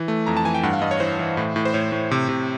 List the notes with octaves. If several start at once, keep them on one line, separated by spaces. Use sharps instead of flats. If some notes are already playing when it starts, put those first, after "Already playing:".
Already playing: E3
A3
F2 A#5
A5
E3 G#5
G5
G2 F#5
F5
G2 D#5
C#5
E3 C5
E3
A2
A2
C5
A2 C#5
A2
C3
C3